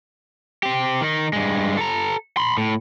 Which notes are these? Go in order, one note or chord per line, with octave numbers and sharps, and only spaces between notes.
C4 G4
D#3 D#4
G2 G#3
A4 A#5
B5 C6
A2